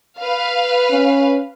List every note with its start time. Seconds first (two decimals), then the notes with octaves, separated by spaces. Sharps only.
0.19 B4 F5
0.91 C#4